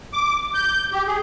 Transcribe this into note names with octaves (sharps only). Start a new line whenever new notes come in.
D6
G6
G4
G#4